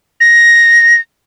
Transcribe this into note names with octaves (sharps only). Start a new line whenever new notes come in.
A#6